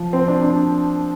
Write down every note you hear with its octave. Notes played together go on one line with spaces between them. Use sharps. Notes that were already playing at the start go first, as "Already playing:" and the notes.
Already playing: F3
C4
D4
D4